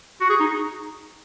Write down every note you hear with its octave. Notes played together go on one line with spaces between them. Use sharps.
F#4
G#4
D#4